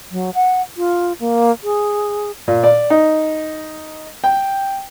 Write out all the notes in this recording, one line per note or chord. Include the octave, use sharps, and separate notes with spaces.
F#3
F#5
F4
A#3
G#4
A#2
D5
D#4
G5